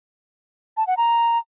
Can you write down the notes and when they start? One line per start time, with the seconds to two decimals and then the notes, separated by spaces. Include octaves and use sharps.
0.77 A5
0.87 F#5
0.97 A#5